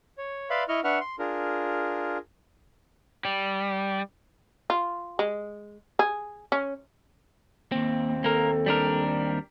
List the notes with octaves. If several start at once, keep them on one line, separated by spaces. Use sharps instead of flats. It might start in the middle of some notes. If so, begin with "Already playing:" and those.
C#5
B4 D5 E5 F5 B5 C6
E4 D#5 C#6 F6
D4 B4 E5 F#5 C#6 F6
C6
D4 F4 G#4 A#4
G3
F4
G#3
G#4
C#4
D#2 A#3 C4
A#3 A4 A#4
G3 D4 A#4